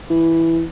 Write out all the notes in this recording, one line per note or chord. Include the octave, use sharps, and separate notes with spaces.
E3